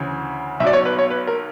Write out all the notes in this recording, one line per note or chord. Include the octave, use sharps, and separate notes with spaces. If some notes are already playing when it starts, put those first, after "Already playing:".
Already playing: D2 C#3 E3
B1 B2 D5 E5
C#5
B4
C#5
B4
A#4